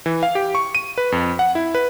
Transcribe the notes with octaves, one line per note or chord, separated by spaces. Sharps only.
E3
F5
G4
C#6
D#7
B4
F2
F#5
E4
B4